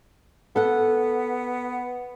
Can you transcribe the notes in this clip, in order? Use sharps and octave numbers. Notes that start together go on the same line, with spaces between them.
B3 A4 F#5